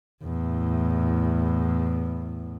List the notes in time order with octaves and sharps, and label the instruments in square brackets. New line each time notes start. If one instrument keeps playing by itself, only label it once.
[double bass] E2 A2